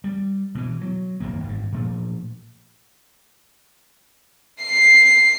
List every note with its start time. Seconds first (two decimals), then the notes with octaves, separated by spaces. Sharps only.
0.04 G3
0.55 B2 E3
0.81 F#3
1.20 D#1 D#2 D#3 A#3
1.44 G#1 G2
1.72 A#2 F3 A3
4.62 C7